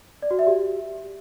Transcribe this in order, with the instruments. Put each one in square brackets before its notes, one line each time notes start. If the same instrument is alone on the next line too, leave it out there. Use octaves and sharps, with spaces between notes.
[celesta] D5
F#4
E5
G4